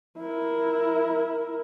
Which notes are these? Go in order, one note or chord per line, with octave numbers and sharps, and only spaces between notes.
E4 A#4